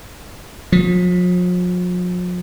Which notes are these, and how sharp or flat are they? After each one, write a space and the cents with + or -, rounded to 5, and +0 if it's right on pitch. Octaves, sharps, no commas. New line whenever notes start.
F3 +45